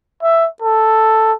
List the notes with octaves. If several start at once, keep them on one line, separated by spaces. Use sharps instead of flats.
E5
A4